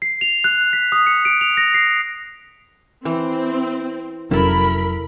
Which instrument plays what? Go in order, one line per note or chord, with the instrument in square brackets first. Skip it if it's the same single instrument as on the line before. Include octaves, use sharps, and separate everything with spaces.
[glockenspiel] C7
F7
F#6
B6
D#6
C#7
D7
F7
A#6
C7
[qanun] E3 [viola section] C4
[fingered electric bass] F1 F#3 C#4 [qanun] E4 A4 [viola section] A#4 B5